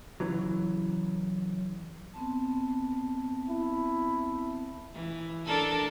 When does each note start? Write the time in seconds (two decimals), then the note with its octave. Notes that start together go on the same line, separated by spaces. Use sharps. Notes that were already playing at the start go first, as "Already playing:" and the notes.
0.20 C#3 E3 F#3
2.14 B3 C4 A5
3.50 E4
4.93 E3
5.45 D4 A4 A#4